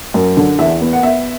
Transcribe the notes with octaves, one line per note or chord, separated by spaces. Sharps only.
F#2
D3
E2 E5
B3
F#5
B3 E5